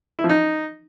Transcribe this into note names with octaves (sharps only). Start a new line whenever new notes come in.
E4
F3
D#4